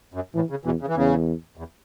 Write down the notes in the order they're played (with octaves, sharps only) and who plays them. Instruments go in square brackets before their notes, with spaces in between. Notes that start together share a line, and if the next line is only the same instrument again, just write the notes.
[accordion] F#2
[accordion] A2 [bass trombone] E3
[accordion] C#3
[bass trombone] E2 [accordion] B2 E3
[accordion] C#3
E3
[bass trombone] E2 [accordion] C#3
[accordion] E2